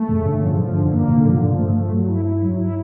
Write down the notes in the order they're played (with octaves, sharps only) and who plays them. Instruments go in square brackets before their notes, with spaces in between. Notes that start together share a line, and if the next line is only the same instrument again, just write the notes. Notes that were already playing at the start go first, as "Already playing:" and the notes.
Already playing: [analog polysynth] A3
[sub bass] F#2 [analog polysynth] C#3
[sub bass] G2 [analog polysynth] D3
[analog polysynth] F3
[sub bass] G#2 [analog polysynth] F3
[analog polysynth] D3
[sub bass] F#2
[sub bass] G2 [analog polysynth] A#3
[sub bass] G#2 [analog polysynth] D3
[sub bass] G#2 [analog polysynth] F3
[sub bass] G2 [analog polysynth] F3
[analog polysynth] A3
A3
F#3
E4
E4
F#3
E4